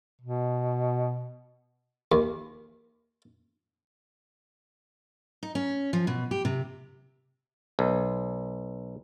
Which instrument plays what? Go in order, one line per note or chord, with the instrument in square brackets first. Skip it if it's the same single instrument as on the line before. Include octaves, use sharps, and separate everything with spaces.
[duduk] B2
[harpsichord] D#2
[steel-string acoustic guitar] D#4
C#4
F3
B2
G4
C3
[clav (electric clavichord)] B1